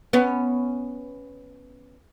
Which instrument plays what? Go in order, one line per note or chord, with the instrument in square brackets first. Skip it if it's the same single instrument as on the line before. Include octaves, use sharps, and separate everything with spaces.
[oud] B3 C#4